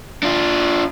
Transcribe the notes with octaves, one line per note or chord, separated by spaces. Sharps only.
D4 F4